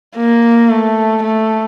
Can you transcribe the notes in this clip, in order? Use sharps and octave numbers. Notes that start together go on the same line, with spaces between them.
A#3
A3
A3